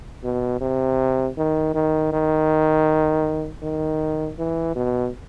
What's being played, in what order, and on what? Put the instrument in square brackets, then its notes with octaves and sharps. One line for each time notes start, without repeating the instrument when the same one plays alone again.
[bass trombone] B2
C3
D#3
D#3
D#3
D#3
E3
B2